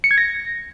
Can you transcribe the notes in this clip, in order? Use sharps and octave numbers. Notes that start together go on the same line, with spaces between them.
C#7
G#6
A#6